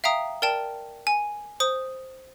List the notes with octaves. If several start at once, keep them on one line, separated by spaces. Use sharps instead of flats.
E5 F5 G5 A#5 D#6
A#4 D5 G5 A5
G#5
C5 D#6